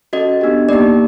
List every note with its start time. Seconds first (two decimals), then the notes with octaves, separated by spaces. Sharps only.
0.13 C#4 F#4 A4 D#5
0.41 B3 D4 G4
0.69 A#3 D#4 G4 D5